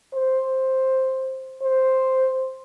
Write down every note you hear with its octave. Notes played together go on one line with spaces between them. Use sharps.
C5
C5